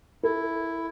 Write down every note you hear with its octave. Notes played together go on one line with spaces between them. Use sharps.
E4 A4